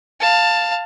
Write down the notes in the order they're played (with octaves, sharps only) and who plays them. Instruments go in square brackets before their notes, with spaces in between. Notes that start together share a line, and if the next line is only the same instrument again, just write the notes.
[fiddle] F5 A5